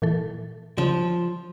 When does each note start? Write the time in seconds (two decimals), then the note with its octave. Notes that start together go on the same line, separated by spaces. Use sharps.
0.02 A#2 E3 A4
0.78 C#3 F3